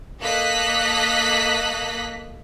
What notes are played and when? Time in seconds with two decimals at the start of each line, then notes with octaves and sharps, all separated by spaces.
0.20 A#3 A4 D#5 F#6 B6